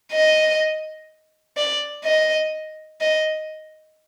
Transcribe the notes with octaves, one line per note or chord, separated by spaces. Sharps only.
D#5
D5
D#5
D#5